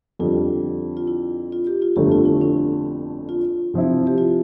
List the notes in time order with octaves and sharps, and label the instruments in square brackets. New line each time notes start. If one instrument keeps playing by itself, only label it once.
[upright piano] F2 D3 G3 [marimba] F4
[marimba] F4
E4
F4
G4
F4
[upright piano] G1 F2 D3 A3 [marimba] G4
[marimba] F4
E4
D4
F4
[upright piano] C3 F3 C4 E4
[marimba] G4
F4